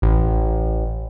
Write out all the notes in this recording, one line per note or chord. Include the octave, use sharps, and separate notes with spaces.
A1